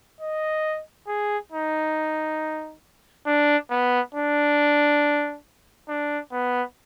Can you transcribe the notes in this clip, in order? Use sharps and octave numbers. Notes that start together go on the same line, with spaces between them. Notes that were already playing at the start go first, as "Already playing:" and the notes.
D#5
G#4
D#4
D4
B3
D4
D4
B3